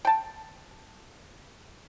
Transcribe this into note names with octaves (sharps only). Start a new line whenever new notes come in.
G5 A5